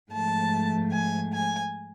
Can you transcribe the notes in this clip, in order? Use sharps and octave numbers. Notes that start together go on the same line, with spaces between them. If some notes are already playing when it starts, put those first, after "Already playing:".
G#2 F3 A3 A5
G#5
G#5